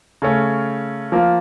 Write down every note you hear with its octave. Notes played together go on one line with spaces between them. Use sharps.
C#3 A3 C#4
F3 A#3 F4